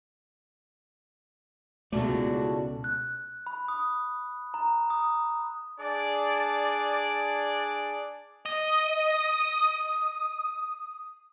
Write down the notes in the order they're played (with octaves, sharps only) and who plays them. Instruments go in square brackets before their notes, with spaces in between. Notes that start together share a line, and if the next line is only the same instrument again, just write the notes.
[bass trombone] C#2 [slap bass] B2 A3 [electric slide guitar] E4 A4 D5 [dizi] F#4
[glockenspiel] F#6
B5
D#6
A#5
D#6
[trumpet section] D4 G#4 D5
[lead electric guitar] D#5 [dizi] D#6